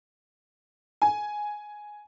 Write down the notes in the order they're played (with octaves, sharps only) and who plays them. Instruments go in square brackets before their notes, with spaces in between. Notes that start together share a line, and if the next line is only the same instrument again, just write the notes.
[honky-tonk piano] G#5